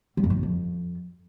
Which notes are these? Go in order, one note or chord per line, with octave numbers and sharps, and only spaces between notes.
G3
F2
D#3
F#2
F2